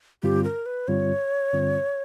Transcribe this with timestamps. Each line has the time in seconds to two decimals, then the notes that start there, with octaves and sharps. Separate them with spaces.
0.23 G2 D3 G3 C4 F4 G4
0.44 A#4
0.66 B4
0.88 G2 D3 G3 C4 F4 C#5
1.53 G2 D3 G3 C4 F4